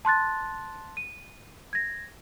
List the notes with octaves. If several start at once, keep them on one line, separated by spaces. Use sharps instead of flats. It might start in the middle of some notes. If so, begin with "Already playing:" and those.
A5 C6 F#6 A6
D#7
G#6 A#6